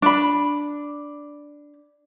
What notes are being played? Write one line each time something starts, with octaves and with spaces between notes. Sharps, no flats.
D4 B5